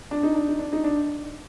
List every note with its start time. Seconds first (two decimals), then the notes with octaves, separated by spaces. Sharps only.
0.11 D4
0.23 D#4
0.35 D4
0.48 D#4
0.59 D4
0.73 D#4
0.84 D4